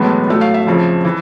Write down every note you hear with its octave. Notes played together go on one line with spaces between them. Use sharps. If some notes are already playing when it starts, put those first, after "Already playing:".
Already playing: B1 A2 E3 G#3 B3 E5
A2 F#3 A3
F5
E5
F2 C#3 F3
E3